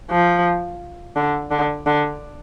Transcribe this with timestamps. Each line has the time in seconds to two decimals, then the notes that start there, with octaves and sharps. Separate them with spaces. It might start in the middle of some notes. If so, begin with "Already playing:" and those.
0.11 F3
1.16 D3
1.51 D3
1.86 D3